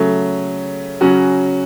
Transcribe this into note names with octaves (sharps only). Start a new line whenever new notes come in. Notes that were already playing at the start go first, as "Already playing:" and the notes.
Already playing: C#3 F#3 A3
C#3 F#3 C#4 F#4